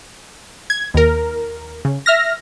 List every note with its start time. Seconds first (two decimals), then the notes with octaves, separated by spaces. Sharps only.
0.70 G#6
0.94 D#2 A#4
1.85 C#3
2.06 E5 F6 A#6